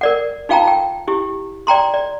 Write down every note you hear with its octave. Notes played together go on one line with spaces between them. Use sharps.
A#4 D5 F#5
D#4 F4 F5 G5 A5 A#5
G5
E4 G4
D5 G5 A#5 C6
D5